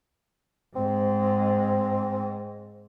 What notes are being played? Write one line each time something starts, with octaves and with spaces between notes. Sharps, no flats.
G#2 G#3 C4